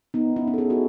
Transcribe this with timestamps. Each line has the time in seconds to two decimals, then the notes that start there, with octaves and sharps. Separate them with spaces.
0.14 B3 D#4
0.36 C#4 E4
0.47 C#4 E4
0.54 A4
0.58 E4 G#4
0.70 F#4 A4